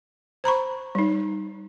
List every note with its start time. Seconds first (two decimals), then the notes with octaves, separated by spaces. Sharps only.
0.44 C5 A#5 B5 C#6
0.95 G3 D#4